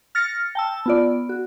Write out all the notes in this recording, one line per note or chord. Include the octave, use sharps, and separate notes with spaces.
F6 A6 A#6 C#7
G5 A5 E6
B3 F4 D5
F#4